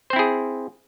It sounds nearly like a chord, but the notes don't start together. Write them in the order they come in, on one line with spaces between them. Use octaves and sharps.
C5 C4 E4 G#4